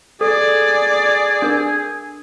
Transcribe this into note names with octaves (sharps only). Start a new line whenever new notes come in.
G#4 A4 D5
D4 A#4